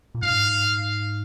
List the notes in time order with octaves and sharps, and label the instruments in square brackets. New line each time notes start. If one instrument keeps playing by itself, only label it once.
[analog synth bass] A#2
[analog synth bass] G#2 [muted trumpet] F5